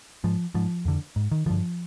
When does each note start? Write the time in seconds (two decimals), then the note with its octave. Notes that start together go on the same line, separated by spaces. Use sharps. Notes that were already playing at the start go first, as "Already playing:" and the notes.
0.24 G#2 F3
0.55 G#2 F3
0.85 F2 D3
1.16 G#2
1.31 D#3
1.46 G2 D3 F3